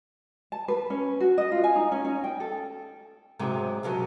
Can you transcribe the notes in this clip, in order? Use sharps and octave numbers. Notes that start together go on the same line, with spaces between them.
A5
B4
C#4
F#4
D#5
F4
G#5
D#4
C#4
C#4
G5
A4
G#2 C3 F#3 G#3
F#2 B2 F3 F#3